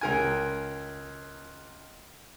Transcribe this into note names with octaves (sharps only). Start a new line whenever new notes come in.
C#2 A#4 G#5